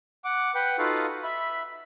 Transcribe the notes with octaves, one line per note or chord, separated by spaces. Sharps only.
F#5 D6
B4 F#5 G5
D#4 F4 F#4 A4 B4 F5
E5 B5